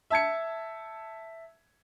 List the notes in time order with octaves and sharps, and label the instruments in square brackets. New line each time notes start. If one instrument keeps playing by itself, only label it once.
[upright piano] E5 A5 G#6 C#7